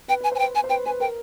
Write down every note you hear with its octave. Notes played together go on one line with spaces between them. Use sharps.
B4 G5
B4 G#5
C5
G#5
G5
C5
B4 G#5
C5
B4 G5
B4 G#5
A#4 G5